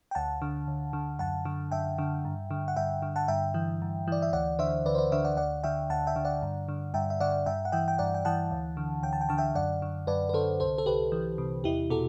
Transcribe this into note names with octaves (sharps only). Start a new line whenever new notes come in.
G5
D2 F#5 A5
D3
D2
D3
F#2 F#5 A5
D3
F#2 E5 G5
D3
G2
D3
F#5
G2 E5 G5
D3
F#5 A5
G2 E5 G5
E3
G2
E3 D5
E5
D2 D5 F#5
D3 C5 E5
D2 B4 D5
C5
B4 D5
D3 C5 E5
D5 F#5
D2 D5 F#5
D3 E5 G5
D2 F#5 A5
E5 G5
D3
D5 F#5
G2
D3
G2 E5 G5
E5
D3 D5 F#5
G2 E5 G5
F#5
E3 E5 G5
G5
G2 D5 F#5
G5
E3 F#5 A5
D2
D3
D2 G5
A5
G5
D3 A5
E5 G5
F#2 D5 F#5
D3
F#2 B4 D5
B4
D3 A4 C5
C2 A4 C5
A4
C2 G4 B4
E3
C3
E2 E4 G4
B2 F#4 A4